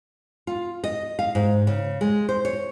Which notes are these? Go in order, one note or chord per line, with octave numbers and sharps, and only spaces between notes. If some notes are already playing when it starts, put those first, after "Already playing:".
F4
D#5
F5
G#2
C#3
G#3
C5
C#5